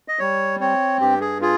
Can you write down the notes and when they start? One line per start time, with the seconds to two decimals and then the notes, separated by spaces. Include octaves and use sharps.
0.08 D#5
0.19 G3 C#5
0.61 C4 C#5
1.01 G2 G4
1.21 G#4
1.41 F4 G#4